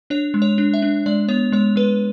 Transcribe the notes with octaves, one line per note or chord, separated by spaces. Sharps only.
D4 C#5
G#3
C#5
D4
E5
D4
G#3 D5
B3 C#5
G#3 C#5
G#3 B4